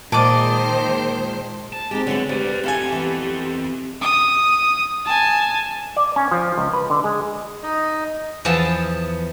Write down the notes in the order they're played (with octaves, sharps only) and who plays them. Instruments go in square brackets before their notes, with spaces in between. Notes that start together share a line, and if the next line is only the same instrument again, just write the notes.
[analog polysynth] A#2 G#3 [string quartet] D#3 C5 [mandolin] D5 D#5 D6 [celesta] A5
[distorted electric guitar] A5
[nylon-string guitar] G#3 D#4 [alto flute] C4 [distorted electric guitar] G4
[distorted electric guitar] D3 [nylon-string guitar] F#3 G#3 B3
[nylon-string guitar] D2 [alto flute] G4 [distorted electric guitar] B4 D5
[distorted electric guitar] C4 A4 [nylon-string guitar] E4 F5 G#5
[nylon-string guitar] E3 B3
[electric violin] D#6
G#5 A5
[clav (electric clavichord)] D5
C#4
F3
C#2
B4
D3
G#3
[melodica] D#4 D#5
[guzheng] E2 F3 B3 A5